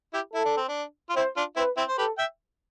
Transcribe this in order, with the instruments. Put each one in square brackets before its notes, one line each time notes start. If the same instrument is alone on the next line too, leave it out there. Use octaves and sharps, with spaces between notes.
[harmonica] E4 G4
[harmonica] E4 [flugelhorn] A4
[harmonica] D4
C4
D4
F4
[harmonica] C4 E4 [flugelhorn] C5
[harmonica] D4 F4
[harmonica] C4 E4 [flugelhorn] B4
[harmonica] C4 E4
C5
[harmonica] G4 B4 [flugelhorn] A4
[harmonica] E5 G5